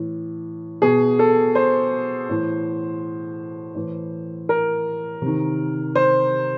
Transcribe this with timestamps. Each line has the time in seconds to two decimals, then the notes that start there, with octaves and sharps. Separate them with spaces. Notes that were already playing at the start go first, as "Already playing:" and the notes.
Already playing: A2 E3
0.82 B2 G#4
1.19 A4
1.55 C5
2.29 A2 E3
3.75 A2 E3
4.49 A#4
5.22 C3 D#3
5.95 C5